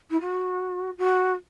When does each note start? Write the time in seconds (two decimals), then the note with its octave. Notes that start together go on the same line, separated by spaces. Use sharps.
0.10 E4
0.20 F#4
0.98 F#4